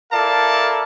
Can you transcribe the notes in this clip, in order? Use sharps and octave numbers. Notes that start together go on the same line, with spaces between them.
E4 A4 A#4 D5 F5 A5